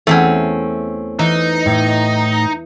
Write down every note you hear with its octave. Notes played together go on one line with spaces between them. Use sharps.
E2 A3 C4 C#4
E3 D#4
A2